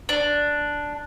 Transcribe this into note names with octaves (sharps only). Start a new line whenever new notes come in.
D4